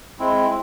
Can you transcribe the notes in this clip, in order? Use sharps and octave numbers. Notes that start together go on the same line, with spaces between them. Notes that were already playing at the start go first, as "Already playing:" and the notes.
G#3 C4 E4